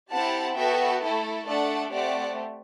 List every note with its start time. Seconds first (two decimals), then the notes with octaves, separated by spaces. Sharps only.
0.11 C4 E4 G4 F#5 A5
0.56 B3 F#4 A4 E5 G5
1.02 A3 E4 A4
1.46 A3 D4 A4 D5 F#5
1.92 A3 C4 G4 D5 F#5